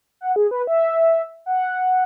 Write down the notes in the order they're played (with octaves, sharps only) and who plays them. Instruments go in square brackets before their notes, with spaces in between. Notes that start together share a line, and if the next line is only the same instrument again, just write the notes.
[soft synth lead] F#5
G#4
B4
E5
F#5